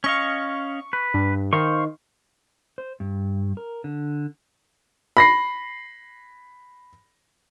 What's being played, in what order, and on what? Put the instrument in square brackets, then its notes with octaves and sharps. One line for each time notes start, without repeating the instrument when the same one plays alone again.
[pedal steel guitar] C#4 D#5 F5 [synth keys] C#6
[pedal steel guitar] B4
[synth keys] G2
[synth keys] D#3 [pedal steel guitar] C5 F5 C#6
[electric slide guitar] C5
G2
A#4
D3
[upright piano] B5 A#6 C7